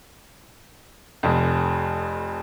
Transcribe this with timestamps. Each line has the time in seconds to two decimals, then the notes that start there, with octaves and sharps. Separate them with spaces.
1.23 F1 F2